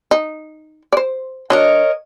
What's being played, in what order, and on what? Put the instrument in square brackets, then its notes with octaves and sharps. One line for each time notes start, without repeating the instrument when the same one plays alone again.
[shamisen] D#4
C5 D5
[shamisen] F#3 D4 [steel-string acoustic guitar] A#4 C#5 D#5